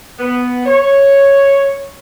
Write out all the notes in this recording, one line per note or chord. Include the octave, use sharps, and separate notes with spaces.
B3
C#5